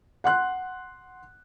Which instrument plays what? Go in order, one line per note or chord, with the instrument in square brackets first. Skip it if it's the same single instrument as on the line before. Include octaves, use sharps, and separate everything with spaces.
[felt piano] F#5 C6 F#6